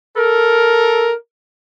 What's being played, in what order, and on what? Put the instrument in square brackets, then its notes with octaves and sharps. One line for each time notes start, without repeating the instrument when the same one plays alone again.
[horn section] A4 A#4